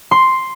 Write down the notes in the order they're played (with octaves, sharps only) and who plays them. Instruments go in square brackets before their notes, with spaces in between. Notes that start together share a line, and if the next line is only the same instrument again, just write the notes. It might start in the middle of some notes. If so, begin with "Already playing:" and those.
[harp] C6